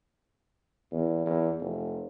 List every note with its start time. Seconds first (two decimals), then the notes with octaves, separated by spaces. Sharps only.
0.92 E2
1.26 E2
1.60 F1